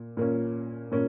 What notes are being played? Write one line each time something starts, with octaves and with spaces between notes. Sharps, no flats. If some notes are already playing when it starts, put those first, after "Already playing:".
Already playing: A#2
A#2 A#3 C#4
A#2 A#3 C#4